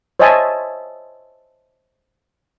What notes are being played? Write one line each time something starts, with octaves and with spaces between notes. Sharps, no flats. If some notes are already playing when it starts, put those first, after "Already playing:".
C5 C#5 D#5 E5 G#5 A5